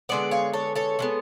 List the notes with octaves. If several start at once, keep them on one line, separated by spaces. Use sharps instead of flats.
D3 G#3 B3 D5 F#5
C#5 F5
A4 C#5
A4 C#5
D3 G#3 B3